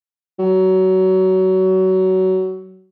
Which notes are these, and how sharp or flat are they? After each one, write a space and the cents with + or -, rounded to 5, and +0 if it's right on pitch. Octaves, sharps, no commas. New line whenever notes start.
F#3 +20